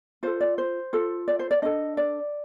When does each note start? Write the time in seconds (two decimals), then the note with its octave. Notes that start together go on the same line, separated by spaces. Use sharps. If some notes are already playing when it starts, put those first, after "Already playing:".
0.23 F4 A4 C5
0.41 D5
0.58 C5
0.93 F4 A4
1.28 D5
1.39 C5
1.51 D5
1.62 D4 A4 D#5
1.97 D5